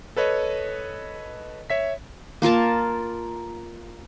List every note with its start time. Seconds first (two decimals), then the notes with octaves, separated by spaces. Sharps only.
0.16 A4 B4 C#5 D#5
1.70 C#5 E5 B6
2.42 A#3 F4 A#4 A5